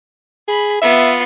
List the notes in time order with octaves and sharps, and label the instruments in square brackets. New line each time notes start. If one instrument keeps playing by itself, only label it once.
[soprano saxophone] G#4 [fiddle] B5
[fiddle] B3 F4 [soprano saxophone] E5